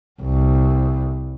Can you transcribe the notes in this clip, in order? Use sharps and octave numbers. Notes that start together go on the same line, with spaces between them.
C2